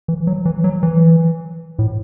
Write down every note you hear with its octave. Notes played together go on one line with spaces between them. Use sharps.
E3
F#3
E3
F#3
E3
A2